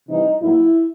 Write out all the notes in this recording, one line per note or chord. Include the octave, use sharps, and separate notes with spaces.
C3 E3 G3 D#4
A2 F#3 A#3 E4